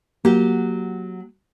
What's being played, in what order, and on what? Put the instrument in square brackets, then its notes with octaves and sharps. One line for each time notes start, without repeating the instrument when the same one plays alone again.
[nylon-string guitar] F#3 G4 [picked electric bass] A#3